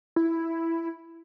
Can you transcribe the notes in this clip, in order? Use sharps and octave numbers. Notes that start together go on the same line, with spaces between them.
E4